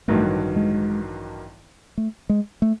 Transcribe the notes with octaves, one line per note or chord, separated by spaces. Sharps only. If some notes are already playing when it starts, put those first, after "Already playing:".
A1 G2 D#3 F#3 A3
G#3
A3
G#3
A3